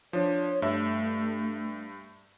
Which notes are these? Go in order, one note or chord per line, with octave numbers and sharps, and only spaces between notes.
F3 D4 C#5
G2 A3 E5